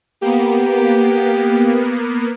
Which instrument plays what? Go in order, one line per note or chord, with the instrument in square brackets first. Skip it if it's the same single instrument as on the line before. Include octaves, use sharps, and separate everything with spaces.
[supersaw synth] A#3 B3 [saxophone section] G4